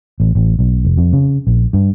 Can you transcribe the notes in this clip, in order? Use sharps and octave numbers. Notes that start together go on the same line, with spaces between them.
A1
A1
B1
F1
F2
C#3
A#1
G2